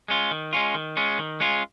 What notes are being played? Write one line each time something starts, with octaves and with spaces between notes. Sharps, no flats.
G#3 C#4 F4
D#3
G#3 C#4 F4
D#3
G#3 C#4 F4
D#3
G#3 C#4 F4